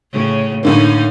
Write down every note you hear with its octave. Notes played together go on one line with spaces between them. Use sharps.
A2 C#3 C#4
A2 D3 A#3 C#4 D#4